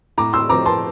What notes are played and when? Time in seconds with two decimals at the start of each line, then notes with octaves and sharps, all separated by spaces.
0.18 A2 A#5 D6
0.33 C6 E6
0.49 F3 C4 A#5 D6
0.66 A5 C6